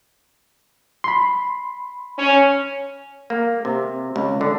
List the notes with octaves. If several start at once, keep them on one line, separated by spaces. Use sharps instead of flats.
B5 C6
C#4
A#3
C3
C#2
D3